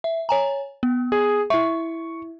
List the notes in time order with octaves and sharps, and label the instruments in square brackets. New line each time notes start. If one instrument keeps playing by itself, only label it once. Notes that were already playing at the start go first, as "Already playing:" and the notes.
[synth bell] E5
C#5 G#5 A#5
B3
[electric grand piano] G#4
[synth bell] E4 E5 [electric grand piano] C#6